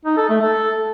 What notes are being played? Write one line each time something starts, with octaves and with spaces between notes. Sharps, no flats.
D#4
A4
A3
A4